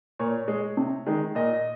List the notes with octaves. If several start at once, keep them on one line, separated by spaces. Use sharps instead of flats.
A#2 C#5
G#3
C3
D#3 G#3
A#2 D#5